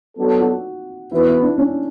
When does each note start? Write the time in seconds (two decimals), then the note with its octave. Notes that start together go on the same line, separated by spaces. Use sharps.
0.17 F#3 B3 D4 A4
0.41 F#4
1.12 E3 B3 E4 F#4 B4
1.27 E4
1.42 D4
1.58 C#4